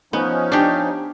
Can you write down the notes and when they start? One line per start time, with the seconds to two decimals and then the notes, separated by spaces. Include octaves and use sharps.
0.13 F3 B3 C#4 D#4
0.52 D4 G4